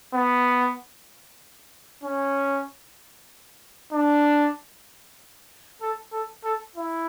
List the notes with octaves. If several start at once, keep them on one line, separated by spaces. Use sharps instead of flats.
B3
C#4
D4
A4
A4
A4
E4